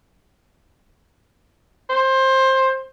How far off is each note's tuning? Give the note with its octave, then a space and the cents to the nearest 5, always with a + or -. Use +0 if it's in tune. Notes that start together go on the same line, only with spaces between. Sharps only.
C5 +20